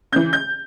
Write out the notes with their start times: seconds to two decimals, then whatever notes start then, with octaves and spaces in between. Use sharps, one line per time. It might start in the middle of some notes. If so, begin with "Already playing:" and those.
0.12 C#3 E3 G6
0.33 G6